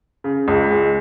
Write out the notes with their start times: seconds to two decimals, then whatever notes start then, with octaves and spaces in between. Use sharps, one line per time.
0.24 C#3
0.48 C#2
0.71 G#3